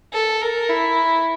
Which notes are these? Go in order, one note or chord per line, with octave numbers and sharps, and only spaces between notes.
A4
A#4
E4